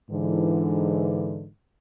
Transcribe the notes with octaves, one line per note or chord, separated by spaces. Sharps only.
G#2 D3 E3